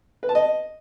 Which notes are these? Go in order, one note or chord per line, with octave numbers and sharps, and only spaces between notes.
B4
A5
D#5